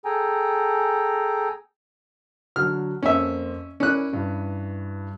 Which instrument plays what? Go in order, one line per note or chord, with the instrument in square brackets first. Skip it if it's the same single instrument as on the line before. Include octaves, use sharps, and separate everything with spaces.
[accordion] G#4 A4 G5 G#5 A#5
[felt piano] D3 F#3 [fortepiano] F6
[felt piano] F2 A#3 C4 [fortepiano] C#4 E5
[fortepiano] C#4 F#6 [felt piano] E4 A#4 D5
[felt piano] G2 E3